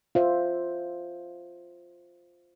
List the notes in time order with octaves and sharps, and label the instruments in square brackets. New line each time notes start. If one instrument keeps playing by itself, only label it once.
[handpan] F4 C5 E5